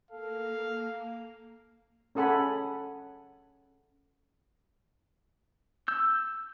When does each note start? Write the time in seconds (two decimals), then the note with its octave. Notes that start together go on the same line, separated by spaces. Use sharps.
0.11 A#3 A4 F5
2.15 C#4 G#4 A4 F#5 G#5 B5
5.88 E6 G6